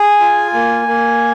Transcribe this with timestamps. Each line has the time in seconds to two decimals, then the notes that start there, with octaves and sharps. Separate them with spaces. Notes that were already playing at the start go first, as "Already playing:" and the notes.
Already playing: G#4 G#5
0.20 F4
0.54 A#3
0.88 A#3